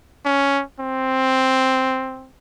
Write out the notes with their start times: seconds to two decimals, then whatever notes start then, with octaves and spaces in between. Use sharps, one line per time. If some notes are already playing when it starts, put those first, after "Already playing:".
0.25 C#4
0.80 C4